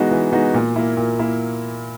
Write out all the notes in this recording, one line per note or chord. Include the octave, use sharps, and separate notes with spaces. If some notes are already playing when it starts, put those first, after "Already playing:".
Already playing: E3 G#3 B3 D#4 F#4
E3
G#3 B3 D#4 F#4
A#2
A#3 E4
A#2
A#3 E4